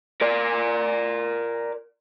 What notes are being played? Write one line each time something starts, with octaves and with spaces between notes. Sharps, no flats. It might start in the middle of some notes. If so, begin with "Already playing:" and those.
A#4 D5